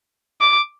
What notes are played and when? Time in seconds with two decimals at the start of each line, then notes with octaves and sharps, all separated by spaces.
0.41 D6